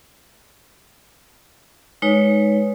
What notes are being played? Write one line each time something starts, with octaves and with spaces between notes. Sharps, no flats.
G#3 D#4 B4 C#5